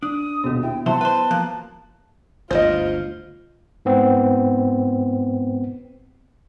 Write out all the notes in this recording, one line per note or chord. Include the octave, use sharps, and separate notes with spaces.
D4 D#6
D#1 B2 B3 F#4
E4 G5
C3 F#3 E4 C5 E5 A5 C6
B4 C5
F3 A#3 F#6
G1 D2 G#2 F4 C5 D#5
G#2 B3 C4